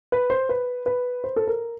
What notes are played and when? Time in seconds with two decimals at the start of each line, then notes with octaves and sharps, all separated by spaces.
0.12 B4
0.30 C5
0.49 B4
0.86 B4
1.24 C5
1.36 A4
1.47 A#4